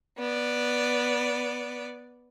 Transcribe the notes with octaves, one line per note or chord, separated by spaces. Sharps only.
B3 D5